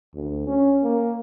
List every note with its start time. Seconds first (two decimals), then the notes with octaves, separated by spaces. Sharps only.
0.14 D2
0.47 C#4
0.83 A#3